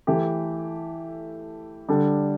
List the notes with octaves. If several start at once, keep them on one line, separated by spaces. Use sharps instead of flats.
E3 A3 G4
D3 G3 D4 A4